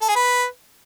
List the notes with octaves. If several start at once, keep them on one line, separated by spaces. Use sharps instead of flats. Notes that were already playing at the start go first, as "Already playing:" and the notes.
A4
G#4
B4